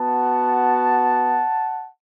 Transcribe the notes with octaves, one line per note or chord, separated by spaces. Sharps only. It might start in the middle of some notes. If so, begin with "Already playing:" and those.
Already playing: B3 F#4 F#5 A5